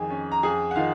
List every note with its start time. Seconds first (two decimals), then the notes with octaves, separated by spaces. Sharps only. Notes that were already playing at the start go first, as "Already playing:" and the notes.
Already playing: F2 D#3 G#4 G#5
0.11 C#4
0.32 A#5
0.43 F2 G#4 G#5
0.71 F#5
0.76 D#3 F4 F5